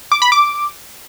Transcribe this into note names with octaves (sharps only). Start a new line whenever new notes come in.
D6
B5
D6